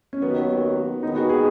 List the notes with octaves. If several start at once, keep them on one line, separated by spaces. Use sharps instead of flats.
C#4
D#2 D#3 F#3 B3
D#2 D#3 G#3 B3 D#4
F#4
G#4